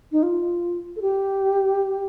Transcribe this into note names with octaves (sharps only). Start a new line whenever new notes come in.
D#4
F4
A4
G4